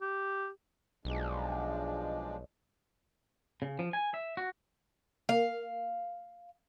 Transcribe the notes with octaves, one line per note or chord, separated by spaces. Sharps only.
G4
B1 F3 G#3 D4
C#3
F3
G#5
E5
F#4
A#3 F5